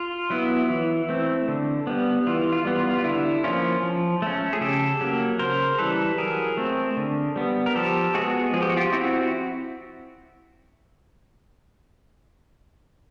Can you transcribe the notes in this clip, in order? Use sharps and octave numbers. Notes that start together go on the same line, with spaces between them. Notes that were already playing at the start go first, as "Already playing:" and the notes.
Already playing: F4
F#3 B3 E4
E3
A3 C4
D3
G3 B3
E3 F4
F4
G3 B3
F4
F4
D3 E4
F3 A#3 C#4 F4
F3
A3 C#4
G#4
C#3 G4 A4
F#3 A#3
C#3 A#4 C5
E3 G3 A4 B4
F#3 G#4 A#4
A3 C4
D3
G3 B3
A#4
F3 G4 A4
G#3 B3 F#4 G#4
F3 G#4
G4
F#4
F4 G4
C4 E4 F#4